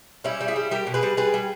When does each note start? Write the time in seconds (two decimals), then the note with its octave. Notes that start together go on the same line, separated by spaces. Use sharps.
0.24 G3 C#4 E4
0.41 G3
0.48 E4 G#4
0.56 G3
0.71 G3 G4 A#4
0.87 B2
0.94 G#4 B4
1.03 G3
1.17 G3 G#4 B4
1.34 G3